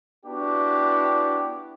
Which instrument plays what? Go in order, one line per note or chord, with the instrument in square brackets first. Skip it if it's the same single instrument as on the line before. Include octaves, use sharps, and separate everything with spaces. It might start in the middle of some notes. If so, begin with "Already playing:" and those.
[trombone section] B3 D4 E4 F#4 G4